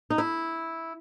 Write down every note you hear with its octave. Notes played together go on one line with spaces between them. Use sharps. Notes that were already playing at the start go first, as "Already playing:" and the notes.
D#4
E4